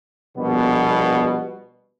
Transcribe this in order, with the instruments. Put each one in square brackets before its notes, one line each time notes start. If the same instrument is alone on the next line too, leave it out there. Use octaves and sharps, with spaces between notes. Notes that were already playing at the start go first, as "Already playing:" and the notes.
[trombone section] A#1 B2 [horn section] G3 B3